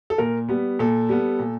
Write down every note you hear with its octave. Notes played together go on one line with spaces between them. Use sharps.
A4
A#2 A#4
G3 B3
A#2 A4
G3 B3
A#2